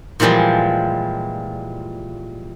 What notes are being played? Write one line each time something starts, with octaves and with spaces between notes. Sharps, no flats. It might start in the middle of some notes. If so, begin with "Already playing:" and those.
A#2 E3 F3 G3 G#3